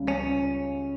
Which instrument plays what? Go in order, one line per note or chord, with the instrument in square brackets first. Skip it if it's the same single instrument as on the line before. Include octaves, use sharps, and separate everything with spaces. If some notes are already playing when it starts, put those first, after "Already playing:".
Already playing: [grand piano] C#2 C#3 G3
[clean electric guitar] C#4